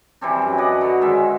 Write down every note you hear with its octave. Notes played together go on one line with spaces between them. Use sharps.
E3 G3 C4 D4
F#2
B4 D5 D#5 F#5
D3 F#3
G#2 D#3 G#3 E5